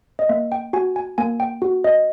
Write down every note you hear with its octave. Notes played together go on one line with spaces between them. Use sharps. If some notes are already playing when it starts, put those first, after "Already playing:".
D#5
A#3 E5
G5
F#4 G#5
G#5
A#3 G#5
G5
F#4
D#5